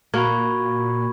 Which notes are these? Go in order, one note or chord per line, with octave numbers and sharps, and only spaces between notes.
A#2 A#3 F#4 B5 C#6 G#6